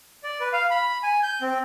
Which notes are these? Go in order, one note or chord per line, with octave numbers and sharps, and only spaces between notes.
D5
B4
F5
B5
G#5
G6
C4